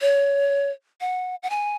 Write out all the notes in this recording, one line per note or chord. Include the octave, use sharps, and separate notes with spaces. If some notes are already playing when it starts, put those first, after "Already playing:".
C#5
F#5
F#5
G#5